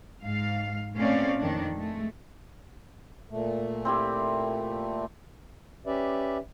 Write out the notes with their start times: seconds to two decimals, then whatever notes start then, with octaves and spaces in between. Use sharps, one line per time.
0.23 G#2 F5
0.96 A#2 A3 C4 C#4 D5 F5
1.40 F2 D#3 D4
1.77 G#3 A3
3.30 A#2 A3
3.85 C4 E4 G4
5.86 C#4 G4 B4 D5 E5